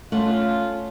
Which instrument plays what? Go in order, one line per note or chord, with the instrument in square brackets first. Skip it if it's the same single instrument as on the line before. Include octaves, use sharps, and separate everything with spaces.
[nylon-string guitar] A3 F#5 [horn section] C#4 F4